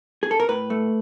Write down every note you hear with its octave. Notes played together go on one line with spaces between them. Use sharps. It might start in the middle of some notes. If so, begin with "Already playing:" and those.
G#4
A4
A#4
A2 B4
A3